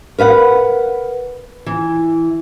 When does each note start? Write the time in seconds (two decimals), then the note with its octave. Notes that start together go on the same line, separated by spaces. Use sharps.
0.18 A#4 B4 F5 F#5
1.66 E3